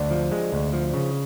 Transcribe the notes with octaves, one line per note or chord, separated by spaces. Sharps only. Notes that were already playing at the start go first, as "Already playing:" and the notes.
Already playing: D2 D4
F3
G#3
D2
F3
C#3